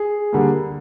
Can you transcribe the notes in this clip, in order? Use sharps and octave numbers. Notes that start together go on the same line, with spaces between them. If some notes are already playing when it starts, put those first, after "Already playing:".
Already playing: G#4
D3 G3 A#3